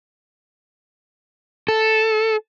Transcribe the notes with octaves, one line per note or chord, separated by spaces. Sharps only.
A4